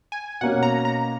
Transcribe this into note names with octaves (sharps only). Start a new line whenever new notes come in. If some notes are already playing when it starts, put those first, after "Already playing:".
G#5
B2 A#3 C#4 F#5
A#5
A#5